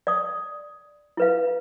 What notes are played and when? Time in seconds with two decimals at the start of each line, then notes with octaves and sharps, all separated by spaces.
0.07 D5 D#6
1.17 E4 B4 F5